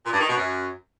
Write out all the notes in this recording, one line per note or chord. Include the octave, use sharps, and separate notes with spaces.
A#2
G2
D#3
B2
F#2